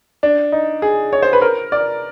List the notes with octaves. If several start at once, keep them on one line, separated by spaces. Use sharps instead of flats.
D4
D#4
G#4
C#5
C5
B4
A#4
D5